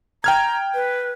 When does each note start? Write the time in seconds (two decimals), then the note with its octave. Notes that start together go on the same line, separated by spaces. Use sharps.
0.24 G5 A#5 F6 G#6
0.74 B4